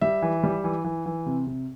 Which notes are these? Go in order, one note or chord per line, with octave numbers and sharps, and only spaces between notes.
G3 E5
E3
G3
E3
E3
E3
C3
C3